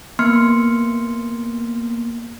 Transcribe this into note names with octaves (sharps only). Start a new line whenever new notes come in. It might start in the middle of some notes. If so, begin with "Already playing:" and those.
A#3 B3 C6 F6 C#7